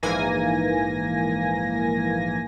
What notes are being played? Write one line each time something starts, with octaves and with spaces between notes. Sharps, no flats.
A#1 G#2 E3 A#3 G#5 A#6